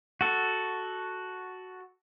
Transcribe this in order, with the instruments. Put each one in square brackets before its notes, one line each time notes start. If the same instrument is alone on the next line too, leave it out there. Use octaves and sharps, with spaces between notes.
[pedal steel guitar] F#4 A4